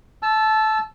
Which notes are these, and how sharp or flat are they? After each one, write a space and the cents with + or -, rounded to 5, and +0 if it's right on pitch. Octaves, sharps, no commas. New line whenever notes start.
A5 -20 E6 +10